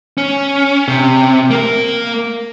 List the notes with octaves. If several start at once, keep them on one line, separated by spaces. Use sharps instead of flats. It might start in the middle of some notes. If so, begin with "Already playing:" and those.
C#4
C3
A#3 A#4